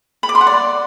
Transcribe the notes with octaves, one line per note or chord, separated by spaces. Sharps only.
B5
D6
C6
F#5
D5